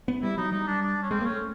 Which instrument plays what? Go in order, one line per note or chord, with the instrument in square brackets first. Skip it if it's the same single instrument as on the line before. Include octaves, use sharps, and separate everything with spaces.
[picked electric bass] B3
[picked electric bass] G3 [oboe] E4
[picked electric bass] F#3 [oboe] D#4
[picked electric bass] G3 [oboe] D#4
[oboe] D4
D4
C#4
[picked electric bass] G#3 [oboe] C4
[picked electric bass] A#3
[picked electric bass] A3 [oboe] C#4